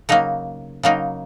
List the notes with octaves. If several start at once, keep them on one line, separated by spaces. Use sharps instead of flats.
C#3 F#3 A#3 D#4
C#3 F#3 A#3 D#4